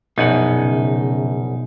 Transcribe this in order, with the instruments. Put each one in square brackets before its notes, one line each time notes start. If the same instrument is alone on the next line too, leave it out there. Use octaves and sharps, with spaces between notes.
[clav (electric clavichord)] A#1 F#2 F#5 [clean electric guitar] B2 D#4
[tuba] C#3